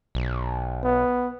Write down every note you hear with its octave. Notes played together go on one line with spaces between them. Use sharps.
B1
B3